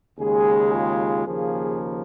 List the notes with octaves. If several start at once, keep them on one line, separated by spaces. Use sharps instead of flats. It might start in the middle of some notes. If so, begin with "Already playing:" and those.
D#2 C#3 G#3 G#4
F4
D#2 C#3 F3 A#3 G#4